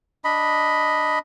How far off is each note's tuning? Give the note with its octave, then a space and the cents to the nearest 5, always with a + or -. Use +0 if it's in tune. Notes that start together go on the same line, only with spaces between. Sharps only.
D4 +0 D#5 +0 B5 +0